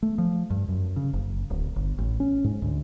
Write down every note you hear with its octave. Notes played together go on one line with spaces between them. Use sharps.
A3
F3
G2
F#2
C#3
F#1
D1
G1
A1
C#4
G#2
D2